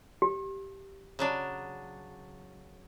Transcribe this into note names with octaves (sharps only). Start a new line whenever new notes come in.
G4
C#3 F#3 D4